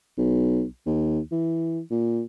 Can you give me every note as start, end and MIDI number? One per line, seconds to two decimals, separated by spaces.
0.18 0.64 35
0.86 1.19 39
1.31 1.80 52
1.90 2.22 46